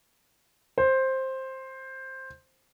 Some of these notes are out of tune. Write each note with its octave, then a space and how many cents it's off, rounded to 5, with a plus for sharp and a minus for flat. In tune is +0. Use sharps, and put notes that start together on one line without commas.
C5 +10